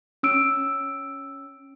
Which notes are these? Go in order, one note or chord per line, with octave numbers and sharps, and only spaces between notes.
C#4 E6 D7